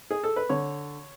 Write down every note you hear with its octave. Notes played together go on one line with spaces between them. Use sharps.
G#4
A4
B4
D3 C#5